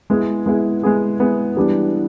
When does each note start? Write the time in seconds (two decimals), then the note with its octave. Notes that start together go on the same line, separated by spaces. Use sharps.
0.10 G#3 B3 E4 G#4
0.46 G#3 B3 E4 G#4
0.83 G#3 B3 E4 G#4
1.20 G#3 B3 E4 G#4
1.56 E3 G3 B3 D4 G4